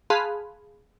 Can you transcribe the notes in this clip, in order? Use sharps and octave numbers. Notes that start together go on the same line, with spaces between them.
G#4 F5 A5 B5 C6 F#6